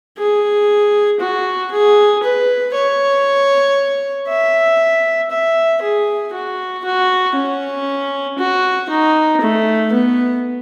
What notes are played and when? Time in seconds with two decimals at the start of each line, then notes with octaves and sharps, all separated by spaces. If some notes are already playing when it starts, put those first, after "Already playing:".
0.18 G#4
1.20 F#4
1.71 G#4
2.23 B4
2.74 C#5
4.29 E5
5.31 E5
5.82 G#4
6.33 F#4
6.84 F#4
7.35 C#4
8.39 F#4
8.89 D#4
9.41 A3
9.92 B3